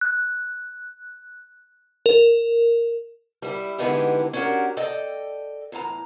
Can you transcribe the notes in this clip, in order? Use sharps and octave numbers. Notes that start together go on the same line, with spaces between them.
F#6
A#4
G3 E4
D3 E3 G#3 B3 D#4 G4
C#4 D4 F#4 G4 A#4
A4 D5 D#5 G5
E2 A2 A5 A#5